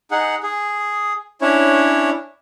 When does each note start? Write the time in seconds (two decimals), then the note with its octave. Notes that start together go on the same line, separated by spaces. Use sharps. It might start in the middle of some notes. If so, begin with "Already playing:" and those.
0.11 D#4 G#4 F#5
0.43 G#4
1.41 C#4 D4 E4 C#5